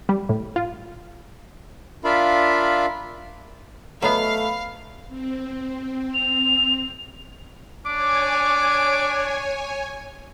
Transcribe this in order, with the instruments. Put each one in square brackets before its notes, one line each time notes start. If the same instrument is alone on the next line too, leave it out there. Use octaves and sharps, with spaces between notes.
[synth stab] G3
A2
F4
[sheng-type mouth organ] D4 F4 A#4 E5 F5 B5
[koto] F#3 B3 [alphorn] A3 [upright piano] D#5 B5 [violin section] F5
[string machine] C4
[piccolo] F7
[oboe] D4 [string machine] C#5 G#5 [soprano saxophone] D6